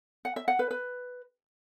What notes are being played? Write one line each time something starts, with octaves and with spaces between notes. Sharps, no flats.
F#5
E5
F#5
B4
B4